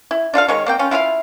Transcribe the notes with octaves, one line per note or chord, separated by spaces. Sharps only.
E4
D4 F4 A4 F5
D#3 G#3 C#5
A#3 C4 G5
C#4 F4
E4 F4 G#4 F5